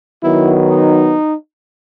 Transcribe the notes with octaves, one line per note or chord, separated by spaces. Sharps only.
D#3 F#3 B3 E4
D#4